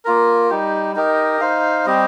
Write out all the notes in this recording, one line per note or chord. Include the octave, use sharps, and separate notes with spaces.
A#3 F4 A#4
G3 D#4 G4
D#4 G4 A#4 D#5
D#4 C5 F5
G3 C4 G4 D#5